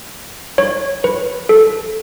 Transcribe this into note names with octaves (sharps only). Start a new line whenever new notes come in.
C#5
B4
A4